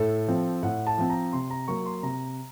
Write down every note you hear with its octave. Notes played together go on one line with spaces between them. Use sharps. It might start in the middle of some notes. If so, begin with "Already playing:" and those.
Already playing: A2 A4
F3 C4
A2 F#5
A5
F3 C4
A#5
C3 C6
A#5
F#3 A#3 C#6
C6
C3 A#5